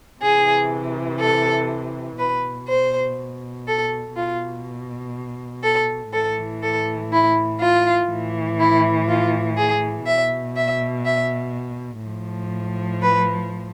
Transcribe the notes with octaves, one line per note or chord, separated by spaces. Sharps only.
C3 E3 G#4
A4
B2 B4
C5
A4
B2 F4
A4
A2 E3 A4
A4
E4
F4
A2 E3
E4
F4
G#4
B2 E5
E5
E5
A2 F3
B4